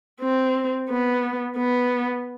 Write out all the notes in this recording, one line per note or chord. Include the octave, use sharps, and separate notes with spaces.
C4
B3
B3